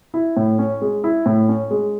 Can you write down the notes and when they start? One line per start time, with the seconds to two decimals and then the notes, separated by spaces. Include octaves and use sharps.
0.14 E4
0.37 A2
0.58 C#4
0.82 G#3
1.04 E4
1.26 A2
1.48 C#4
1.71 G#3